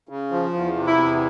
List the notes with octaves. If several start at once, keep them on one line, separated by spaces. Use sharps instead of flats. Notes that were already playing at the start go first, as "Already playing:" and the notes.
C#3
F3
E2
C3
E4
E2